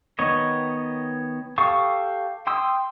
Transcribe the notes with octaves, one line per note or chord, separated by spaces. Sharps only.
D#3 B3 C#5 D#5
G4 A4 F5 C#6 D#6
G5 C6 D#6 E6